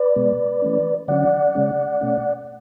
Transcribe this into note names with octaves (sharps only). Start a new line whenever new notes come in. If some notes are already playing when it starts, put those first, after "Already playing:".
Already playing: B4 D5
B2 G#3 B3
E3 A3 C#4
D3 F#3 C#4 D5 F#5
C#3 G#3 C#4
B2 A3 C#4